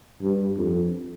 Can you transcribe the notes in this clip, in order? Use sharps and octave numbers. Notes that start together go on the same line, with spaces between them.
G2
F2